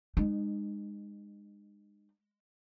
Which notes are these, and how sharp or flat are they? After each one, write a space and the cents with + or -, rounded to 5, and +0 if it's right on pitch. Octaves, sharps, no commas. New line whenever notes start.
G#3 -20 D#4 -35